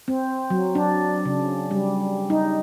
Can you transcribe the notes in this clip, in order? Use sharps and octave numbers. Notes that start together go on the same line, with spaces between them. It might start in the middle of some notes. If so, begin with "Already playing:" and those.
C4
F#3
D4
C#3
G3
D#4